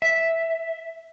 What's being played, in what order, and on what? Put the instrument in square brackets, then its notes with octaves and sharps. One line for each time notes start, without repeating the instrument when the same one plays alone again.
[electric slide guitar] E5